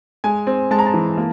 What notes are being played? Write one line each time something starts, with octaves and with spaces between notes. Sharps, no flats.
G#3 G#5
C4
G#3 A5
A#5
A5
E3
A#3